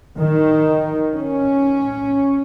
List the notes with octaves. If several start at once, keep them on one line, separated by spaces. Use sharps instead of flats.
D#3
C#4